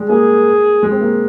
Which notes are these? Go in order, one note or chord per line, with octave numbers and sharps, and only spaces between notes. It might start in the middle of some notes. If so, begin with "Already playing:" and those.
Already playing: G3 G#3
A#3 G#4
G#3
C4
A#3